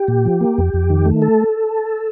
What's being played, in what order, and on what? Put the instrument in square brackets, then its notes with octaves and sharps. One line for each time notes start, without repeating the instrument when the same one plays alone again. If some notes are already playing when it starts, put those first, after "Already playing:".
Already playing: [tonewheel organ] G4
A#2
F3
A#3
F2
F2
D#3
A3
A4